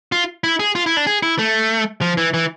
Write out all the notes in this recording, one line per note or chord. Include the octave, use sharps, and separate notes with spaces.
F4
E4
G#4
F4
E4
D4
G#4
E4
A3
F3
E3
E3